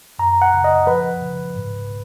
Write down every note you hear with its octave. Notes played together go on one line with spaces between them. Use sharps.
F#2 A#5
F#5
C#3
D#5
F3 B4
C#3
G#2